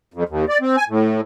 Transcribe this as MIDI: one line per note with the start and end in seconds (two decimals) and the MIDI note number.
0.14 0.24 41
0.29 0.45 39
0.49 0.58 74
0.61 0.76 60
0.77 0.84 80
0.89 1.21 45